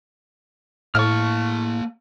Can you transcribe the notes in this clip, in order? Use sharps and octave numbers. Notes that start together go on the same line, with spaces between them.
A2 A#3 A5 C#6 F6